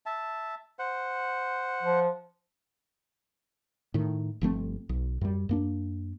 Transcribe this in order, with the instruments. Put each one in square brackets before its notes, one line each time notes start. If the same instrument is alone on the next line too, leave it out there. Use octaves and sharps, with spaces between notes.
[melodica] E5 A5
C5 F#5
[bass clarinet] F3
[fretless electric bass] A2 D#3
G1 F3 A3 C4
B1
F#2 G3
F#2 A#3 D4